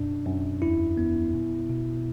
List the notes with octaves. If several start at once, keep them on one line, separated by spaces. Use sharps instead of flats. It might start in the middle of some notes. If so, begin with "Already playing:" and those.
Already playing: F#2 B2 D4
F#2
E2 E4
B3
B2
B2